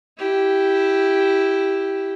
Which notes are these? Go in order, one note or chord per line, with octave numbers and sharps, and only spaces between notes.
E4 G4